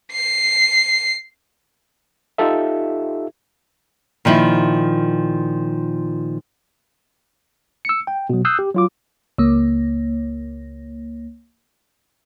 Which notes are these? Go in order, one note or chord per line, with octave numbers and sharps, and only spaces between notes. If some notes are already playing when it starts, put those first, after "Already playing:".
C7
D#4 F4 G4 A4 E5
A#2 D#3 F3 E4
E6 C#7
G5
B2 F#3
D#6 E6 F#6 G6 C7
G4
F#3 F4 D6
C#2 A#3